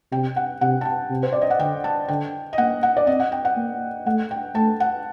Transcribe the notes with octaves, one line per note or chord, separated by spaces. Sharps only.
C3 G5
F#5
C3 F#5
A5
G5
C3
C5
D5
D#5
F#5
D3 G5
A5
D3 G5
D#5
A#3 F#5
F#5
D5
C4 D#5
F#5
G5
F#5
A#3
A3 F#5
G5
A3 A5
F#5